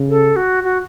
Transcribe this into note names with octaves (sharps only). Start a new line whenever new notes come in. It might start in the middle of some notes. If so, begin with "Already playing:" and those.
Already playing: C#3
A4
F#4
F#4